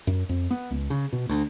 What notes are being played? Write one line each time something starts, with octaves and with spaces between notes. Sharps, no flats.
F#2
F2
B3
C#2
C#3
B2
D2